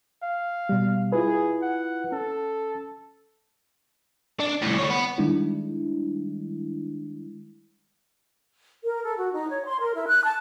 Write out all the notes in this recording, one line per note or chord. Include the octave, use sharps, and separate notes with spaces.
F5
B2 G3
E4 F4 G#4 B4
F#5
C#4 A4
D4
C2 A2
D3 C#5
B3
D#3 G3 G#3 D4 E4
A#4
A4
F#4
D#4
C#5
C6
A#4
E4
F#6
A5